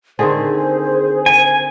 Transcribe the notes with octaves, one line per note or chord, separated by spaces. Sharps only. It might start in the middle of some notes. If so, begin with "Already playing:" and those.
D3 D#3 C4 G#4 C5
G#5